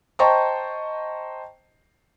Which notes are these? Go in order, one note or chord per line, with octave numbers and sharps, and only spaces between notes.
C5 D#5 G5 A5 A#5 C#6